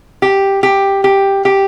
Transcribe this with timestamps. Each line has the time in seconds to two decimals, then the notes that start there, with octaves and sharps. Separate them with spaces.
0.22 G4
0.63 G4
1.04 G4
1.45 G4